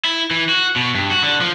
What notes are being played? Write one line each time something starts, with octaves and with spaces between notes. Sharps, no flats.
E4
E3
F#4
B2
G2
F#4
D3
F3